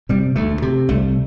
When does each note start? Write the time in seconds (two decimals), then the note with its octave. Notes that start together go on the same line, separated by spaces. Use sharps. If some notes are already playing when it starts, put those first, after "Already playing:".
0.09 C3 G3
0.36 D2 A3
0.62 C3
0.89 C2 A3